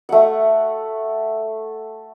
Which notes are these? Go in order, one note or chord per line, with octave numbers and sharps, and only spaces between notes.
A3 F#5